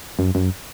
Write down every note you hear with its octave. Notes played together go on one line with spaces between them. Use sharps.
F#2
F#2